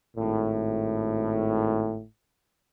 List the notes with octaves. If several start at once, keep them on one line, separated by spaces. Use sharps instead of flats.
G#1 A2